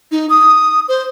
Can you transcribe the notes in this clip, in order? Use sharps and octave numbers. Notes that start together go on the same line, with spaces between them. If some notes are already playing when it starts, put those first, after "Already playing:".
D#4
D#6
C5